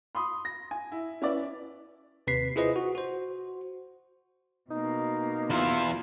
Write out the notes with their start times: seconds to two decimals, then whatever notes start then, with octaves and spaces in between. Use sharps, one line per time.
0.15 B5 C6 D#6
0.45 A#6
0.71 G#5
0.92 E4
1.22 C#4 E4 B4 D5
2.27 D#2 C3 B4 B6 C7
2.56 E4 F4 G#4 B4 C5 D#5
2.76 F#4
2.95 F#4 C5
4.71 B2 A#3 D#4
5.50 E2 E4 F4